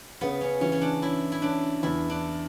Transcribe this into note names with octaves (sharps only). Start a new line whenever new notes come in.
C#3 B3
C#4
E3 C#4
C#4
D4
C#4 E4
E4
C#4 D4
E2 E4
D4